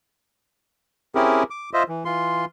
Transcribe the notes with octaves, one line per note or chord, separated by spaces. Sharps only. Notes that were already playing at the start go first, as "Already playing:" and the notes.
C4 C#4 E4 G4 G#4 A#4
D6
F4 C5 D#5 E5
E3
E3 F4 C6